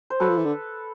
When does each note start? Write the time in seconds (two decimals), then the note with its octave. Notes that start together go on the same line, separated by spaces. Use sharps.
0.10 C5
0.20 F#3 A4 B4
0.29 F3
0.37 E3
0.45 D3